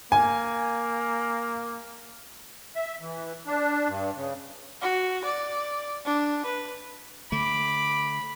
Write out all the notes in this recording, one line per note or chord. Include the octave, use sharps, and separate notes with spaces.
A#3 G#5
E5
E3
D4
G2
C#3
F#4
D5
D4
B4
D3 A3 B5 D6